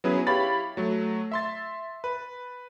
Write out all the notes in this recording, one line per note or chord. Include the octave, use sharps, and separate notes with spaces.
F#3 B3 C#4 E4 G#4 B4
E4 G4 C#5 F5 B5 A6
F#3 A3
E5 C6 A6
B4